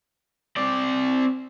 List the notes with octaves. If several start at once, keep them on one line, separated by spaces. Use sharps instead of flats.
C4 D5